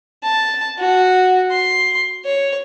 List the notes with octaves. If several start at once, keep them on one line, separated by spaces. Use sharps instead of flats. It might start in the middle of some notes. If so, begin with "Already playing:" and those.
A5
F#4
C6
C#5